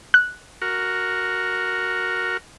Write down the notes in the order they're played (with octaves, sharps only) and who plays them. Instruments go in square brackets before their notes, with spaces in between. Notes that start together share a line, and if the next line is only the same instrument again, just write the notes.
[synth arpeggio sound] F#6
[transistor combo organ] F#4 A#4